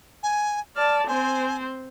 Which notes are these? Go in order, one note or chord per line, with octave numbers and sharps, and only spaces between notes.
G#5
D5 A5 F6
C4 C5 G#5